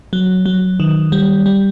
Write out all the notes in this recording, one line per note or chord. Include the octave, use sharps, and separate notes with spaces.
F#3
F#3
D#3
G3
G3